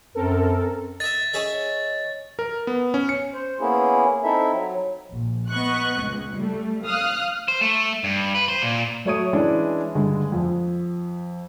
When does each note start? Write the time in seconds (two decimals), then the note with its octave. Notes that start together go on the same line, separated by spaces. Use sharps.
0.15 F#2 C4 A4 A#4
1.00 D#5 E5 A6
1.34 C#4 G#4 D#5 E5
2.39 A#4
2.67 B3
2.94 C#4
3.09 C#7
3.34 C5
3.60 A#3 B3 C#4 E4 G#4
4.24 C4 D#4 E4 A4 E5
4.52 F#3
5.11 A#1
5.50 B3 D#5 C#6 F#6
6.01 C#2
6.36 G3 A3
6.84 F5 D#6 F6 F#6
7.48 C5
7.61 A3
8.04 G2
8.35 B4
8.48 C5
8.62 A#2
9.05 F#3 A3 C#5 D#6 D#7
9.33 E3 G#3 C#4 D4 E4
9.95 G2 D3 G#3
10.32 F2